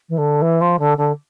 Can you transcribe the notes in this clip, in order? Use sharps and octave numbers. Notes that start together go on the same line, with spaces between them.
E3
D3
E3
F3
D3
D3